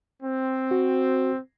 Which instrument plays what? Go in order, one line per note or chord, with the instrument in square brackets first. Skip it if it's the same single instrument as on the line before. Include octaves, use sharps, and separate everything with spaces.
[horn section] C4
[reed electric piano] F#4